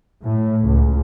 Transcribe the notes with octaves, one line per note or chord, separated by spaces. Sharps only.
A2
C#2